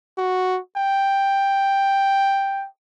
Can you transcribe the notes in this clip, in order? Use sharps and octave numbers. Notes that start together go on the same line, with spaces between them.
F#4
G5